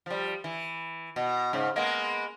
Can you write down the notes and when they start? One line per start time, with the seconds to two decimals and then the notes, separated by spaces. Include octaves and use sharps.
0.06 F3 G3
0.44 E3
1.16 B2
1.53 G#2 C#3
1.76 G#3 A#3 B3